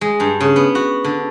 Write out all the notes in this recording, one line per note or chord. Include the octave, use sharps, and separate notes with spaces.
G#3
G2
C#3
B3
F#4
D3